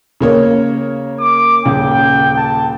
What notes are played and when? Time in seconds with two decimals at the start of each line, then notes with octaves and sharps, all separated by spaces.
0.21 C#3 A#3 C#5
1.20 D6
1.65 D#1 C#3 G5
2.37 A5